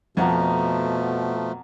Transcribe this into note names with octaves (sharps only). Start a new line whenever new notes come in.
F2 B2 F3 A3 F#5 A5 A#5